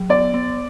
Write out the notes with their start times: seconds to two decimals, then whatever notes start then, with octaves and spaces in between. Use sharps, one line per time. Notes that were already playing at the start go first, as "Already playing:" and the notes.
Already playing: F#3
0.10 B3 D5
0.34 B3